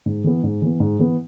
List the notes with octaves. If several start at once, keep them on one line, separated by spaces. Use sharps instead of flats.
G#2
E3 B3
G#2
E3 B3
G#2
E3 B3